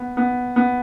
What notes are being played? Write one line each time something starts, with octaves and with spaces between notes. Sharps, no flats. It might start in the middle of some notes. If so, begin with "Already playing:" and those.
Already playing: B3
B3
B3